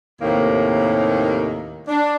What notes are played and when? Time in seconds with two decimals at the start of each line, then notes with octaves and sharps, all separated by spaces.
0.22 D#2 A2 C3 D#3 A#3
1.88 D4